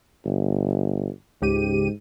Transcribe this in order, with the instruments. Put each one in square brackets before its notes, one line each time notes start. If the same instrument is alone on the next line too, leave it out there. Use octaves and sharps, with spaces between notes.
[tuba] G1
[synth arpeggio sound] C#2 G4 D#7 [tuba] G#2